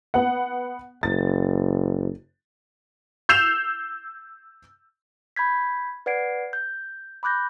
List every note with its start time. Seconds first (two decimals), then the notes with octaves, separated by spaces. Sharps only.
0.14 B3 F#5
1.03 F#1 A6
3.29 E6 G6 C7 E7 F7
5.36 B5 G6 G#6 B6
6.06 B4 D5 F#5 G#6 C7 D7
6.53 G6
7.23 B5 D6 F#6 G6 A#6